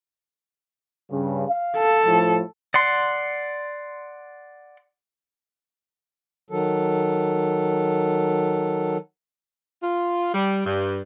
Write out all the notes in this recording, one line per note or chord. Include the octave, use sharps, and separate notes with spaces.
G2 C#3
F5
A4
A2 F3
D5 F#5 C6
D#3 F#3 A4
F4
G3
G2